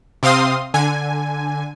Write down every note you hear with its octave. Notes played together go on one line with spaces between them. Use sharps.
C3 C4 F5 C6 D#6
D3 G#5